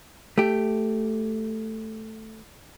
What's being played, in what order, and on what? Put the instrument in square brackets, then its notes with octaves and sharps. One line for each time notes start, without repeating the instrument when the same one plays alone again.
[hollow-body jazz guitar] A3 G4